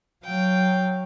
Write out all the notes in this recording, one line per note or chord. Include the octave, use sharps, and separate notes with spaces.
F#3 F5 G5